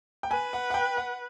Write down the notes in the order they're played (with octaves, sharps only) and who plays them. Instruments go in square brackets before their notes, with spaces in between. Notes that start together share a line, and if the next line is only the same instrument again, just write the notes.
[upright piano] G5
[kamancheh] B4 [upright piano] G#5
[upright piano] F#5
F#5
G5
F#5